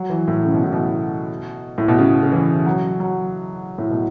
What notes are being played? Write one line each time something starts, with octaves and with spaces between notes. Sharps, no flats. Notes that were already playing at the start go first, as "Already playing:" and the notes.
Already playing: F#3
E3
A2
C#3
B2
A2
B2
A2
B2
C#3
C#3
E3
F#3
F#3
A2
B2